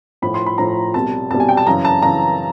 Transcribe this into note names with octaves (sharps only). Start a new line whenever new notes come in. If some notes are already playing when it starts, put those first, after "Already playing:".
A2 F3 B5
C6
B5
A2 F3 A#5
C2 B2 G3 A5
C2 B2 G3 A5
G#5
G5
A5
F#2 C#3 E3 A#5
A5
F#2 C#3 E3 A#5